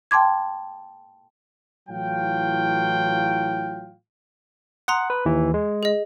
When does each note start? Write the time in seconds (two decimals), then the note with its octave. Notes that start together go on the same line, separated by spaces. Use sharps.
0.11 G5 A5 C6 D6 G#6
1.89 A2 E3 F#3 F4 F5 G5
4.88 F#5 A#5 C6 D#6
5.10 B4
5.26 D#2 E3
5.54 G#3
5.83 G#4 D#5